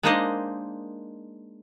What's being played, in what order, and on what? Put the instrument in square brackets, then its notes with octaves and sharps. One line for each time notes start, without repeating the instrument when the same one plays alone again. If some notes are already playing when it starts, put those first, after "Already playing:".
[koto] G#3 A#3 D4 D#4 C5 D#5